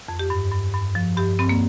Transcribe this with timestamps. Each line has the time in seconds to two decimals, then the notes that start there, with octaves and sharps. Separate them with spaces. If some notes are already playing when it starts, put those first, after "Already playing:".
0.08 F2
0.19 G4
0.30 G2
0.52 G2
0.74 G2
0.95 F3
1.17 G2 G4
1.39 G2 C4
1.49 A#3